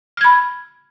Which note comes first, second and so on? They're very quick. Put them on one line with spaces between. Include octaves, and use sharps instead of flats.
F6 G#6 B5